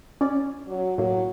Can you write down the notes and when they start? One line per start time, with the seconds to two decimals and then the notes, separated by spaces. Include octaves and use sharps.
0.21 C#4 D5
0.68 F#3
0.98 A2 F#3 A#3